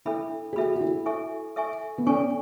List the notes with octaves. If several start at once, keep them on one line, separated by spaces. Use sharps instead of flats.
D4 E4 A4 E5 B5
G#4
D4 F#4 A4 E5 B5
F#4
E4
A4 E5 G#5 C#6
A4 E5 G#5 C#6
B3
C#4 D4 A4 D5 G#5 C#6